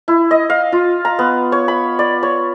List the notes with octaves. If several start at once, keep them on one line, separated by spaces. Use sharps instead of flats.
E4
D#5
F5
F4
A#5
B3
C#5
B5
D5
C#5